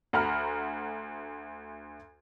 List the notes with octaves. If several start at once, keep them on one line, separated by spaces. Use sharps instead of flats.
D2 F#5 A#5 B5 F6